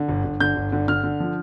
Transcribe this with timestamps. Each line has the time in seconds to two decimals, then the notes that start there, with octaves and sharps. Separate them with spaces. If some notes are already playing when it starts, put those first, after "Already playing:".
Already playing: D3
0.08 G1
0.24 G1
0.40 D3 G6
0.56 G1
0.72 D3
0.88 D3 F6
1.03 D3
1.20 F3